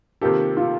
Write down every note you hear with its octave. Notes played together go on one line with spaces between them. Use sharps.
C3 D#3 A#3 F4 G4 A4
F4